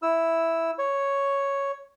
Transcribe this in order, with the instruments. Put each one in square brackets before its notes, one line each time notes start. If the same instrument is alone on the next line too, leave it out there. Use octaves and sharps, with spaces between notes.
[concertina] E4 E6
C#5